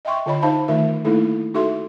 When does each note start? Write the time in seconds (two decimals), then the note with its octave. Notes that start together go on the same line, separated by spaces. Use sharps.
0.05 D#5 E5 G5 C6 C#6
0.26 D3 F4 C#5 D#5 B5
0.42 D#4 C5 F5 A5 B5
0.68 D#3 A3 D#4 F4 A#4 E5
1.05 A3 A#3 D#4 E4 A4
1.54 D#4 F#4 A4 E5 C6